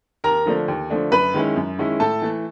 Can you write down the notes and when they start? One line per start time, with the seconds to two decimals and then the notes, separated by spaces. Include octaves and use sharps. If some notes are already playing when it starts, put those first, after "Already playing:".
0.24 D#2 A#4 A#5
0.46 D3 F3 A3 D4
0.68 D#2
0.90 D3 F3 A3 D4
1.12 F#2 B4 B5
1.34 D#3 G#3 C#4 E4
1.56 F#2
1.78 D#3 G#3 C#4 E4
2.00 A2 A4 A5
2.22 E3 A3